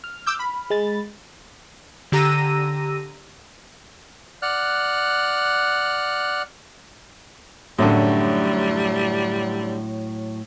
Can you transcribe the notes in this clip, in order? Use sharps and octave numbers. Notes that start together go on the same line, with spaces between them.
F6
D6 E6 G6
B5
G#3 A6
D3 G4 A#5 E6 A#6 D#7
D5 F#5 F6 F#6
F#2 A2 D3 F#3 G3